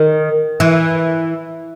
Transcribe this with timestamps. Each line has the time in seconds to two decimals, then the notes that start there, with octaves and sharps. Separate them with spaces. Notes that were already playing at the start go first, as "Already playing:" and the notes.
Already playing: D#3
0.60 E3